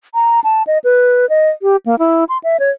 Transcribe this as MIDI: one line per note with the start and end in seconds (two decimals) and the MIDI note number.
0.14 0.40 82
0.44 0.63 81
0.67 0.78 75
0.84 1.28 71
1.30 1.50 75
1.62 1.76 67
1.86 1.96 58
1.99 2.24 64
2.29 2.38 84
2.44 2.57 76
2.60 2.70 73